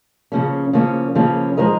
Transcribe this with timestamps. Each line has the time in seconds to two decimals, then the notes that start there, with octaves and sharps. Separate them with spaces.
0.32 C#3 F3 A#3 C#4
0.73 C#3 F3 A#3 C#4
1.15 C#3 F3 A#3 C#4
1.57 F3 G#3 D#4 A#4 D#5